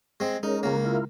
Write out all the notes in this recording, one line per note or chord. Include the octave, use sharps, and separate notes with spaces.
G#3 C4
G#3 C#4 D#4 A#4
C#2 A#3
E4 F4 A#4